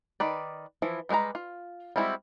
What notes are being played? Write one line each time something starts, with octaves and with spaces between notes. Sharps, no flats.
D#3 B4 D5
E3 F3 E4
G3 G#3 A#4 B4 A#5
F4
G3 G#3 C4 E4 F#4